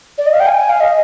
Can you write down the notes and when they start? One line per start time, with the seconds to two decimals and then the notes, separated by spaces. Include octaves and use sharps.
0.18 D5
0.26 D#5
0.33 F5
0.40 G5
0.47 G#5
0.58 G#5
0.69 F5
0.80 D#5